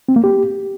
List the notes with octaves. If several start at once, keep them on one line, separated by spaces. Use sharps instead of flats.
C4
A#3
G4